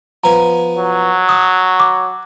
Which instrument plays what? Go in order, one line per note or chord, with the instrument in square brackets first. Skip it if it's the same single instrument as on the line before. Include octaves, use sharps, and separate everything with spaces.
[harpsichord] F3 B3 G#5 [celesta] A#5
[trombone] F#3
[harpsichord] A5 [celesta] D#6
[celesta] D6